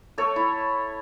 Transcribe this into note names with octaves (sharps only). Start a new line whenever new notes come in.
A3 A4 C#5
E4